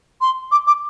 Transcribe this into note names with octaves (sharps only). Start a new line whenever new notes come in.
C6
D6
D6